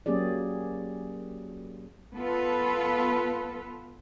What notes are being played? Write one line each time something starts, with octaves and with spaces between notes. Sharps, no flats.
F#3 A#3 C#4 G4 G#4 D5
B3 F4 A4 B4